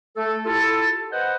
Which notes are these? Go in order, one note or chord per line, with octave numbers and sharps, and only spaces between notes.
A3 A4
E4 F4 G4 A4
B4 C5 D#5 F#5